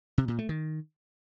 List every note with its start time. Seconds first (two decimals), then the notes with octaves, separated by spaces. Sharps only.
0.18 C3
0.28 A#2
0.39 A3
0.49 D#3